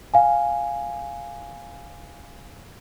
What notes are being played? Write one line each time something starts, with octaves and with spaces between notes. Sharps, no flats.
F5 G#5